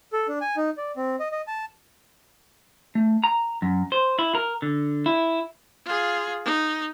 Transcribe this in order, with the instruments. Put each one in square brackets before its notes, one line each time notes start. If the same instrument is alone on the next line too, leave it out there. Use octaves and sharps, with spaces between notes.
[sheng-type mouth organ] A4
D4
G#5
D#4
D5
C4
D#5
D#5
A5
[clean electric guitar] A3
A#5
F#2
C5
E4
A#4
D3
E4
[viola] F4 G#4
D#4